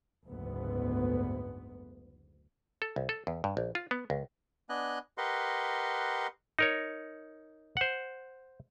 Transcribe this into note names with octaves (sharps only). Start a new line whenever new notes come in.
F#1 D2 G#2 B3
A4
C2
A4
E2
G2
A#1
F4
B3
C#2
B3 D4 D#5 G#5 F#6
G4 A#4 B4 D#5 F#5 C6
D#4 A#4 C#5
C5 F#5